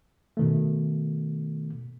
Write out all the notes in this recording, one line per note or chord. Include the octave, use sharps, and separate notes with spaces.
B2 D#3 A3